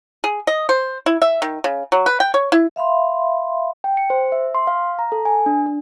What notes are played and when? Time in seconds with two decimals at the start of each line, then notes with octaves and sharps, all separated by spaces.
0.24 G#4
0.47 D#5
0.69 C5
1.06 E4
1.22 E5
1.42 D#3
1.64 C#3
1.92 F#3
2.06 B4
2.20 G5
2.34 C#5
2.52 E4
2.76 E5 F5 B5 C6
3.84 G5
3.97 C#7
4.10 C5
4.32 E5
4.55 C6
4.67 F5
4.99 A#5
5.12 A4
5.25 G#5
5.46 D4
5.66 D4